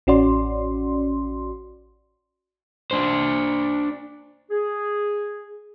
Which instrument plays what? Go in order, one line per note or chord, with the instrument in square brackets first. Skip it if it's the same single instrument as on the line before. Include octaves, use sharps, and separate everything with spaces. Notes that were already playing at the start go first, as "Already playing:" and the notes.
[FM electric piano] A1 C#4 F#4 D5 C6
[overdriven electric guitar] D4 C5
[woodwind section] G#4